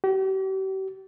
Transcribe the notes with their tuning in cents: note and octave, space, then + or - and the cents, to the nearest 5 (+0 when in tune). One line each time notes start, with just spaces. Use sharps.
G4 -40